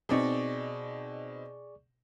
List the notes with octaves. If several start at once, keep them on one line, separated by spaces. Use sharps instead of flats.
B2 C4 D#4 G#4 D5 C#6